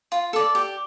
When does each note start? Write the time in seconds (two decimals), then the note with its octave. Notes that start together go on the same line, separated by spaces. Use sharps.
0.12 F4
0.33 A4 D5
0.55 G4